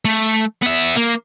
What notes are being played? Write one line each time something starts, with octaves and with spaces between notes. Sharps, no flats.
A3
B3 E5
A#3